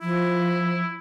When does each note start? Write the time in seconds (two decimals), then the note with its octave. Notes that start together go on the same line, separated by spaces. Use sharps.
0.01 F3 E4